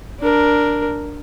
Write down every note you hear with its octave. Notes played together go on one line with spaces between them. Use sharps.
D4 A#4